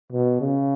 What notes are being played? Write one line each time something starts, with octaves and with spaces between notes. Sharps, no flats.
B2
C#3